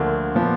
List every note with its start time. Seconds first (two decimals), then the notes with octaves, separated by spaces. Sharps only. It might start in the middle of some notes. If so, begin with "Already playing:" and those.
Already playing: D2 D3 F3 A#3
0.35 A#2 F3 B3